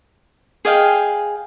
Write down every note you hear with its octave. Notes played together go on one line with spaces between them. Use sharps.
G#4 D#5 F5 G5